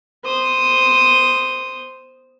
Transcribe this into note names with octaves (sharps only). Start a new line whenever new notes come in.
C5 D#6